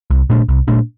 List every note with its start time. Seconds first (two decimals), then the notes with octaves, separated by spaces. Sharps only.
0.10 C2
0.30 A#2 A3 D4
0.49 C2
0.68 A#2 A3 D4